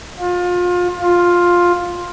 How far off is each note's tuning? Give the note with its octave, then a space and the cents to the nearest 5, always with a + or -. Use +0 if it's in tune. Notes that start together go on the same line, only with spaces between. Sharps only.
F4 +30
F4 +10